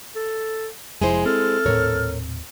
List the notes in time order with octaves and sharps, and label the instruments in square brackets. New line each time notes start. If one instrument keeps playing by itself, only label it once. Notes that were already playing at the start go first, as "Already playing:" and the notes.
[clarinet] A4
[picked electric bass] F1 F2 [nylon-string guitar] G#3 E4 C5 [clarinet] G#5
[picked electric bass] C4 [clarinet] A4 [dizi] F6
[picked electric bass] D#1 A2 C4 [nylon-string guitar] A#4 C#5